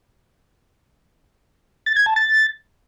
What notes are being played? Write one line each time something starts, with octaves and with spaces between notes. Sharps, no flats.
A6
G#6
A5
A6